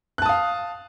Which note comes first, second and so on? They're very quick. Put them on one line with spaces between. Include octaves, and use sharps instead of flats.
F#6 A5 D#6 F5